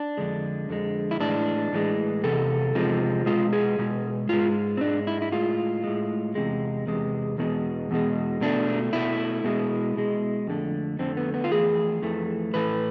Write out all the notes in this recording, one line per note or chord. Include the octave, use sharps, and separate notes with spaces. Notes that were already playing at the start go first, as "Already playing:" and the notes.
Already playing: D4
F2 D3 G#3
F2 D3 G#3
E4
A2 E3 G#3 D4
A2 E3 G#3
E2 C3 A4
E2 C3 F3 G#3
B2 G#3 F4
G#4
B2 G#3
G#2 G#3 F4
C4
G#2 G#3 D4
E4
E4
A2 G#3 F4
A2 G#3
E2 C3 G#3
E2 C3 G#3
E2 B2 G#3
E2 B2 G#3
B2 A3 D4
B2 A3 E4
B2 G#3
B2 G#3
F2 D3 A3
F2 D3 A3 C4
B3
B3
F4
F2 E3 A3 G#4
F2 E3 A3
A2 E3 A3 B4